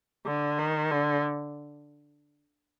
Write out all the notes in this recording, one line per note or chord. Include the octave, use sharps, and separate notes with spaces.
D3
D#3
D3